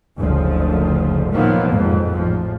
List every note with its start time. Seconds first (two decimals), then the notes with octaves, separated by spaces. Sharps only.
0.18 F#1 D2 A#2 F3
1.31 A#2 D#3 F3 F#3 A#3 B3
1.70 G#1 F2 G#2
2.13 A1 F3